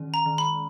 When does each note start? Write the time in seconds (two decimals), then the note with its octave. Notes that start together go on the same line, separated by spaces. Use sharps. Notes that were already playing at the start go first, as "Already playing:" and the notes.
Already playing: D#3 G#3 C#4
0.14 A#5
0.26 D#3
0.38 B5